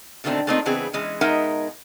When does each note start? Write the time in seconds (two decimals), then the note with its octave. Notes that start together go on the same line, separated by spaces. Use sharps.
0.24 B2 D3 D#3 A3 C4 D4
0.47 A3 A#3 C4 D4 D#4 F4
0.65 C#3 E3 B3 C4 G#4
0.93 E3 G#3 C#4
1.21 B2 G#3 D#4 A#4 E5 F#5